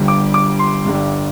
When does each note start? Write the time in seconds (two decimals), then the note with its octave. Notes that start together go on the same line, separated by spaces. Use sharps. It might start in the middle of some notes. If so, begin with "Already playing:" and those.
Already playing: G1 G2 D3 G3
0.08 D6
0.34 D6
0.59 C6
0.85 G1 G2 D3 G3